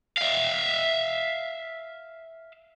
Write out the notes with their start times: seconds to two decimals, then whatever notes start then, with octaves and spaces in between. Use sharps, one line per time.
0.17 E5 F5